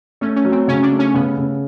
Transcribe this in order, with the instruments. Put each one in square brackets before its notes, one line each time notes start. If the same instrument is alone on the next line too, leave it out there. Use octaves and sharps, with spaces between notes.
[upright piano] A3 [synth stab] C#4
[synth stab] C#4
[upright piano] F#3
[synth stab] C4
[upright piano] C#3 [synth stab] C#4
[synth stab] D4
[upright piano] A3
[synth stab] C#4
[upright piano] C#3 [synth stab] B3
[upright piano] C#3